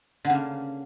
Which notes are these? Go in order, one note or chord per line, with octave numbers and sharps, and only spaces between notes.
D3
C#3
A#3